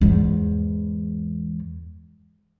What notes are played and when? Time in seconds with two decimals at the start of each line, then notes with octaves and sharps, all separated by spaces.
0.01 E2 G#2